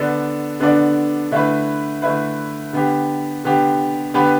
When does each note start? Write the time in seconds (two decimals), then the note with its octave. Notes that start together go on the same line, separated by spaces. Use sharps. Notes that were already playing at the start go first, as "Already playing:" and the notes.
Already playing: D3 B3 D4 A4 D5
0.60 D3 B3 D4 A4 D5
1.32 D3 A3 E4 B4
2.02 D3 A3 E4 B4
2.73 D3 B3 G4
3.44 D3 B3 G4
4.14 D3 B3 G4 B4